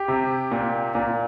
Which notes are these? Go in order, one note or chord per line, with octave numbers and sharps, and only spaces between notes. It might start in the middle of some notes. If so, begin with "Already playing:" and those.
Already playing: G4
C3
A#2
A#2